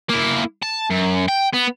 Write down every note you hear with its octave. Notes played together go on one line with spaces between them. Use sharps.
A#3 E4
A5
F#2
G5
B3